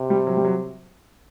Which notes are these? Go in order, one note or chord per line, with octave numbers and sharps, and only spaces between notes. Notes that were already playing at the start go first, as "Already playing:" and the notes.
Already playing: C3
G3
F#3
G3
F#3